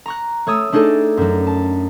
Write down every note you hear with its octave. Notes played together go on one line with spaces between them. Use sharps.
A#5 C#6 F#6
A3 C#5 D#6 E6
A3 D4 D#4 G#4 A4
F#2 F#3
A5